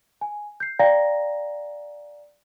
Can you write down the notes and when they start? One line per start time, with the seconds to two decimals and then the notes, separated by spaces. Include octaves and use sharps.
0.21 G#5
0.60 G6 C7
0.79 D5 F5 G5 A#5 A#6